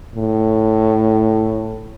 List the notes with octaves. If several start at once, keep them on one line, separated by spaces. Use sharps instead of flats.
A2